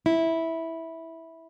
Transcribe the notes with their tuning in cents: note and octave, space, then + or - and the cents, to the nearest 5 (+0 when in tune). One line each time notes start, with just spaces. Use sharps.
E4 -10